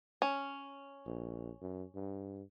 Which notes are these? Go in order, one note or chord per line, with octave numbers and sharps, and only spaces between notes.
C#4
A#1
F#2
G2